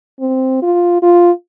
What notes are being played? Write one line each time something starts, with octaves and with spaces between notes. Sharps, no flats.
C4
F4
F4